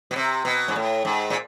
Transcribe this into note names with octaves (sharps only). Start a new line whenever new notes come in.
B2
C3
B2
G#2
A2
G#2
A#2